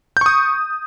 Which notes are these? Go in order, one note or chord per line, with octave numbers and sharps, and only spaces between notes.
C#6 D#6 G6